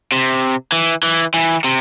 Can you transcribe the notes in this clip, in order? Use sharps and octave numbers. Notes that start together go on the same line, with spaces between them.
C3
E3
E3
E3
C3